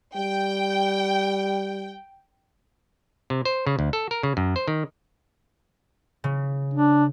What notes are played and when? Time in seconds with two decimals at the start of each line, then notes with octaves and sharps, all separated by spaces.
0.16 G3 G5
3.30 C3
3.45 C5
3.67 C#3
3.79 D2
3.93 A4
4.11 A#4
4.23 C#3
4.37 F#2
4.56 C5
4.68 D#3
6.24 C#3
6.74 D4